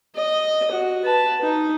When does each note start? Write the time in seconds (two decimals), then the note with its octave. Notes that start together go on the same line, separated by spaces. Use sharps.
0.15 D#5
0.71 F#4
1.04 B4 A5
1.42 D#4